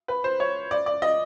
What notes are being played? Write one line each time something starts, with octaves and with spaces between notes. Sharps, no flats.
B4
C5
C#5
D5
D5
D#5